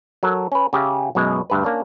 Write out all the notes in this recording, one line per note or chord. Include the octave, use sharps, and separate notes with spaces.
F#3 A4 A#4
C#4 B4
C#3 G4 G#4 E5 F5
B1 F#2 B2 G#3
D2 G2 B4
A#3 C#4 D4